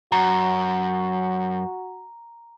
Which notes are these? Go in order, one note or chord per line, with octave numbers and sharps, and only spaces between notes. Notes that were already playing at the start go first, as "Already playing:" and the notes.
F#2 F#4 A#5